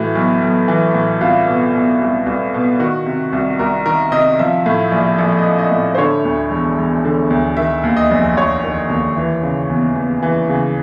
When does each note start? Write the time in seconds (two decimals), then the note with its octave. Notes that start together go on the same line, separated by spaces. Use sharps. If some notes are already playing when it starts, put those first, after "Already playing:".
Already playing: A2 E3 F#4
0.15 B1
0.42 B1
0.68 E3
0.94 A2
1.21 C2 F4
1.48 B2
1.74 B2
2.01 C2
2.26 C2
2.54 B2
2.79 D#3 F#4
3.06 C3
3.33 C2
3.59 C2 A#4
3.86 D#3 A#4
4.12 C3 D#5
4.39 F3 E5
4.66 A2
4.92 A#1
5.18 A#1 E5
5.38 D#5
5.45 F3
5.59 D#5
5.71 A2
5.95 C5
5.98 D3 C#5
6.25 D2
6.51 E1
6.78 E1
7.05 D3
7.30 D2
7.57 D#3 E5
7.84 D#2
7.97 D#5
8.11 F1
8.37 F1 C#5
8.63 D#3
8.90 D#2
9.17 E3
9.43 C#3
9.70 E2
9.95 E2
10.22 E3
10.49 C#3